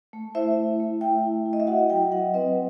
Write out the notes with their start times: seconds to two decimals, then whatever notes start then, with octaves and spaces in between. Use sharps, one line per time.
0.13 A3
0.35 E4 C5 E5
0.57 E4
0.79 A3
1.01 A3 E5 G5
1.24 E4
1.46 E4
1.53 D#5
1.60 E5
1.67 F#4 D#5 F#5
1.90 F#3 E5 G5
2.12 F#3 D#5 F#5
2.34 C4 B4 D#5